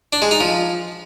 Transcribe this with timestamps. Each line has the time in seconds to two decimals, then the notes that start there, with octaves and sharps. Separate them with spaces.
0.13 D4
0.22 G#3
0.31 D#4
0.40 F3